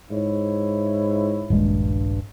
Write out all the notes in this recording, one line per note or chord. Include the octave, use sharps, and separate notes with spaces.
G#2 E4 C#5
D#1 A#1 G2 G#3